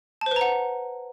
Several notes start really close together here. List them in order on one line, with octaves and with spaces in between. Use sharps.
A5 C5 B4 A#5 F#5